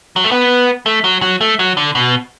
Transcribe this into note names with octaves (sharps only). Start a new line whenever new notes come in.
F#3
A3
B3
A3
F#3
F#3
A3
F#3
D3
B2